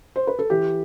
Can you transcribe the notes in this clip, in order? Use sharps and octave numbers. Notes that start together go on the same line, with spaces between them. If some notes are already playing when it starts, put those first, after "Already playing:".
C5
B4
A4
E3 G4